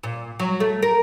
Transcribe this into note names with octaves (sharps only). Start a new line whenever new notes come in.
A#2
F#3
A3
A#4